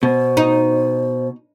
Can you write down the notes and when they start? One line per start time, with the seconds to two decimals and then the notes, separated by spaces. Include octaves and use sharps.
0.03 B2 C5
0.37 D#4